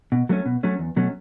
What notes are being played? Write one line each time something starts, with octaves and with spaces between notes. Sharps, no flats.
B2
F#3 A3 C#4
B2
F#3 A3 C#4
E2
B2 F#3 A3 C#4